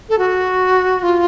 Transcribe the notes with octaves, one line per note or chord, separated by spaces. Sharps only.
A4
F#4
F4